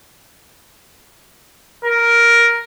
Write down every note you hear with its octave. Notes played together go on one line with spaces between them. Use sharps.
A#4